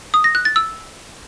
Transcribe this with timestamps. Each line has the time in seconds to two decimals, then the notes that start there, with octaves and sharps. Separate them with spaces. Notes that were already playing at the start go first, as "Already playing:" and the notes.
0.14 D#6
0.24 A#6
0.35 F#6
0.45 A6
0.56 E6